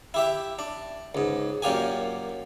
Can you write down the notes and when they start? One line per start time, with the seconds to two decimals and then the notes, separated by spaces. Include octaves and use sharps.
0.14 E4 G4 E5
0.59 D4
1.15 C#2 G#2
1.62 F#2 A#2 A#3 G4 G#5